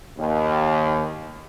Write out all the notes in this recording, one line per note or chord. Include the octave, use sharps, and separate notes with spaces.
D#2